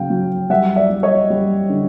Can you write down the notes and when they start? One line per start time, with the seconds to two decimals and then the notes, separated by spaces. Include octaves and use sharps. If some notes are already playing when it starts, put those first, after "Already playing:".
Already playing: C#3 F#3 F5 G5
0.10 F#3
0.50 G3 E5 F#5
0.76 D5 E5
0.90 G3
1.03 C#5 D#5
1.30 G3
1.69 D3